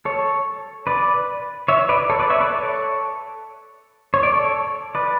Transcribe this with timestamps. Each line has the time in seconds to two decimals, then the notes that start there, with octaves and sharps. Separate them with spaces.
0.05 A4 C#5
0.87 B4 D5
1.68 C#5 E5
1.89 B4 D5
2.10 A4 C#5
2.20 B4 D5
2.30 C#5 E5
2.40 B4 D5
2.50 A4 C#5
4.14 C#5
4.23 D5
4.33 A4 C#5
4.95 B4 D5